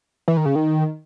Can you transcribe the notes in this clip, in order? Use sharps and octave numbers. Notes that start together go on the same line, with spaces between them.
E3
D#3
C#3
D#3